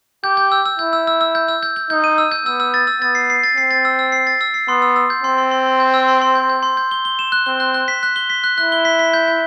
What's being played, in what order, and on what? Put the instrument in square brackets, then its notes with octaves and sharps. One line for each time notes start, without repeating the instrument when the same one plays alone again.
[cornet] G4 [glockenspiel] G6
[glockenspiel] G6
E6
E6
[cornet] E4 [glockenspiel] G6
[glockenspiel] E6
E6
E6
G6
E6
G6
G6
[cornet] D#4 [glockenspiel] G6
[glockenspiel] D#7
E6
G6
[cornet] B3 [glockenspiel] E6
[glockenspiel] E6
A6
E6
[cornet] B3 [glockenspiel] A6
[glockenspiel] C7
C7
A6
[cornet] C4 [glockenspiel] C7
[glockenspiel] A6
E6
E6
C7
A6
E6
C7
[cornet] B3 [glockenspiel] C6
[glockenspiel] E6
E6
G6
[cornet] C4 [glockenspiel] C6
[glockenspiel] C6
C6
C6
G6
E6
C6
C6
G6
G6
C6
G6
G7
G7
E7
F#6
[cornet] C4 [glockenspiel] G7
[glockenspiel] F#6
F#6
B6
F#6
G7
B6
F#6
[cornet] E4 [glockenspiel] F#6
[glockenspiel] G7
B6
B6
G6
G6